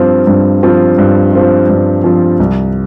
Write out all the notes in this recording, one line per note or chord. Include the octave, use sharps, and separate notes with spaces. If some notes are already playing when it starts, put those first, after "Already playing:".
Already playing: G2 F3 C4 F4
G2
F3 C4 F4
G2
F3 C4 F4
G2
F3 C4 F4
C2